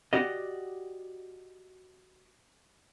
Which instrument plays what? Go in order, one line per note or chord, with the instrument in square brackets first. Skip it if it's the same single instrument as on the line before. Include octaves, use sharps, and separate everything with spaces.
[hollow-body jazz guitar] F#4 G4 D5 D#5